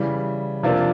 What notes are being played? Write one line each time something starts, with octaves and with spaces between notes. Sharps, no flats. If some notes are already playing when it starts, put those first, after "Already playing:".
Already playing: C#3 E3 G3
C3 F3 A#3 D4 F4